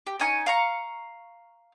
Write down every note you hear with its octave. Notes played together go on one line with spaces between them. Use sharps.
G4
C#4 D#4 G#5 C#6
F5 A#5 C#6